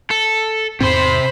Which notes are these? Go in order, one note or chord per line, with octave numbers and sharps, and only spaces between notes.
A4
E2 G#2 C3 C4 C5 B5 C6